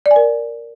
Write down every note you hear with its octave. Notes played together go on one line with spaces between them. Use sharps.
D5
G#5
A#4